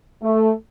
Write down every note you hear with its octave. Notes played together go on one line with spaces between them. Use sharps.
A3